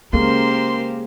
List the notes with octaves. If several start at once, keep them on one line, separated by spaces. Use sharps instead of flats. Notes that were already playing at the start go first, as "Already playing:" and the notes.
C#3 G#3 A#3 C#4 G4 A#4 C5 C6